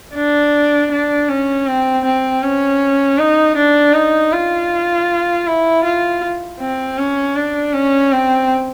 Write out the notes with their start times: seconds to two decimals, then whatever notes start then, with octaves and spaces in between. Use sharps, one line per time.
0.15 D4
0.91 D4
1.29 C#4
1.67 C4
2.05 C4
2.43 C#4
3.19 D#4
3.57 D4
3.94 D#4
4.33 F4
5.47 E4
5.84 F4
6.60 C4
6.98 C#4
7.36 D4
7.73 C#4
8.12 C4